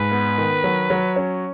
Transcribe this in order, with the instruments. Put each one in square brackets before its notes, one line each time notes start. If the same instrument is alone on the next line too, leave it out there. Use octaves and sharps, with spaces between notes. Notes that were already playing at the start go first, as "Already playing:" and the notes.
Already playing: [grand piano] G#2 [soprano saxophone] B4
[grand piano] B3
D#3
F#3
F#3
C#4